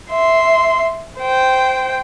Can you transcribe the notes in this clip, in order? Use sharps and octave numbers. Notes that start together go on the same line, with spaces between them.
E5 C6
C5 G5